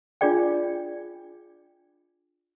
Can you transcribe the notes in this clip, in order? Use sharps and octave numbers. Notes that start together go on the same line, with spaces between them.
D4 F4 G#4 D5 G5